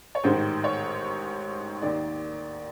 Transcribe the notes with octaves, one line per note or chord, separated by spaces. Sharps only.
C#5
A1 G#2 D#3 C5
C#5
D#2 D#3 D5